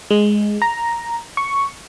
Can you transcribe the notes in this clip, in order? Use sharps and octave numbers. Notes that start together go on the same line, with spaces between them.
G#3
A#5
C#6